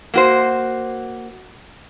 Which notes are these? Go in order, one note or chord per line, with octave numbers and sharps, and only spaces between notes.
A#3 F#4 C5